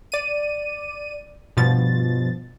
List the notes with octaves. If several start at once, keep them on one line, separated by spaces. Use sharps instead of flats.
D5 D#7
G2 B2 F3 A6